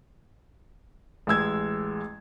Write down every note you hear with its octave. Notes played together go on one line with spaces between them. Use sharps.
A1 G#3 E6 G#6